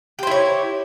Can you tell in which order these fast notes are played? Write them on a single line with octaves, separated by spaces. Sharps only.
G4 C5 E4 C#5